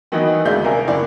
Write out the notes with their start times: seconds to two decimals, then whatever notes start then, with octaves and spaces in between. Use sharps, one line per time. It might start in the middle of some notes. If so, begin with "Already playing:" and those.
0.12 D#3 E3 F#3 B3 D#4 E4
0.45 D2 G#3 D5 E5 F5 G6
0.64 C2 A#4 G#5
0.88 F#1 A#3 E4 D5